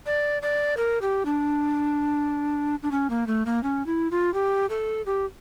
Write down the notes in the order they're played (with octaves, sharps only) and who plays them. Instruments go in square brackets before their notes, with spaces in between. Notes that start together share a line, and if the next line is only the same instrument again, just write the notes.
[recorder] D5
D5
A#4
G4
D4
D4
C#4
A#3
A3
A#3
C#4
E4
F4
G4
A4
G4